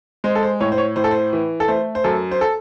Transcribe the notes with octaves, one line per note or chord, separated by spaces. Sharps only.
G#3 C5
A4
C5
A2 C#5
C5
C#5
A2 C5
A4
C5
E3
A4
A3 C5
C5
F#2 A4
C5
A4